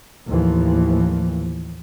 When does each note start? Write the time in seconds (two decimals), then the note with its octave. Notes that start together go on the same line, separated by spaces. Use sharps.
0.28 D#2 A2 E3 F3